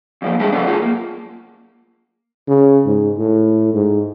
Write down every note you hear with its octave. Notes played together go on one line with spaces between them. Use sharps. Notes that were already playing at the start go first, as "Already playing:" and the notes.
E2 F3 A#3
G3 G#3 B3 D4 E4 G#4
C#3 F3 F#3 A3 B3 D4
F#3 A3 F4 G#4
A#3
C#3
G#2
A2
G#2